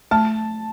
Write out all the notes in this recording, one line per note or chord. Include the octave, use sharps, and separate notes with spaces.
A3 A5